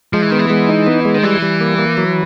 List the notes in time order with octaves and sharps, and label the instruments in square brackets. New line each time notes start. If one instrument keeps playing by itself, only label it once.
[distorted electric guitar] F3 [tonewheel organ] G#3
[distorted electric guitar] E3
[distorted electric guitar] D#3 [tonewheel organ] B3
[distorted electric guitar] E3
[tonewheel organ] G#3
D#4
B3
G#3
[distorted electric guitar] D#3
[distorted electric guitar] E3 [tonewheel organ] G3
[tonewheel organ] G3
A#3
A#3
F#3